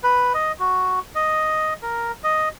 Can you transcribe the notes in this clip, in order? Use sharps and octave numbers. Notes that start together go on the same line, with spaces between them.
B4
D#5
F#4
D#5
A#4
D#5